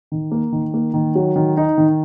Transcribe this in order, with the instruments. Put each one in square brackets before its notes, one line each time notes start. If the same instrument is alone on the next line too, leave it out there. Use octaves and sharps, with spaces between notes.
[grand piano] D#3
A#3
D#3
A#3
D#3
F#3
D#3
D#4
D#3